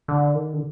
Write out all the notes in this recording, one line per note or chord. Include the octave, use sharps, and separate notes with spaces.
D3
D#3
D3